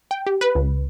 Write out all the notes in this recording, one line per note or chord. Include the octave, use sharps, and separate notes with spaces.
G5
G4
B4
C#2